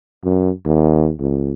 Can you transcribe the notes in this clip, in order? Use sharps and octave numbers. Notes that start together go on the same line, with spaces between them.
F#2
D#2
C#2